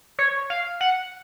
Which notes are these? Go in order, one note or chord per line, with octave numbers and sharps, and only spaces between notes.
C#5
F5
F#5